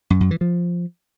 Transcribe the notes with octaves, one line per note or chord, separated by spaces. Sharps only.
F#2
F#2
E3
F3